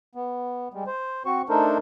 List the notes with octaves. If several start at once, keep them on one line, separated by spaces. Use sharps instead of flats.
B3
G3 G#3
C5
C4 F#4 C#6
A3 D4 D#4 A4 A#4 C5